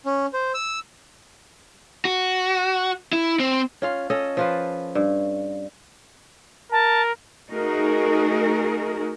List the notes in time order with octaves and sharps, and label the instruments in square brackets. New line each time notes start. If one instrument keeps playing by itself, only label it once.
[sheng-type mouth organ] C#4
C5
E6
[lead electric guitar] F#4
E4
C4
[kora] C#4 F4 F5
C#4 A4 D#5
F3 F4 B4
G2
[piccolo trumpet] A#4 [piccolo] A5
[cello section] A3 D#4 F#4 G#4 A#4